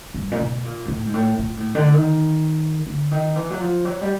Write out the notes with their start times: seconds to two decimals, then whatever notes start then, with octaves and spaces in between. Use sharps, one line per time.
0.14 G2
0.32 A#2
0.40 B2
0.64 A#2
0.85 G#2
0.88 A2
1.06 G#2
1.14 A2
1.39 A#2
1.57 A2
1.75 D3
1.93 D#3
2.87 D3
3.11 D#3
3.36 E3
3.51 F#3
3.60 F3
3.85 F#3
4.01 G3